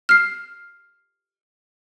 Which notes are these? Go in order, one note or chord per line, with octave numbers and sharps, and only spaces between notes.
F6 C7